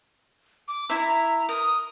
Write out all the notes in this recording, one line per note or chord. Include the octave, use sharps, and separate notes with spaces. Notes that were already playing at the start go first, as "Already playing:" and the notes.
D6
E4 E5 A#5
A#4 D#6